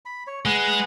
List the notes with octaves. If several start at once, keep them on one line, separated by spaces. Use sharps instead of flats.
B5
C#5
G#3 G#4 B4 F#5